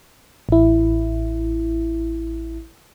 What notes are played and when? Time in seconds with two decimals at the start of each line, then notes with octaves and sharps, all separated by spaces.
0.49 A1 E4